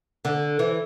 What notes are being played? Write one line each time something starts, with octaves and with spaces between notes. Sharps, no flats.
D3
E3